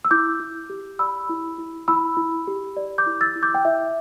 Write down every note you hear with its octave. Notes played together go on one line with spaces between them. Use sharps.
E6
E4 D6 G6
E4
G4
D5 B5 E6
E4
E4
E4 B5 E6
E4
G4
D5
D6 G6
E4
E6 A6
E4
D6 G6
G5
E4 E5